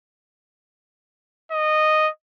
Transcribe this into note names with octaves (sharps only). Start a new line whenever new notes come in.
D#5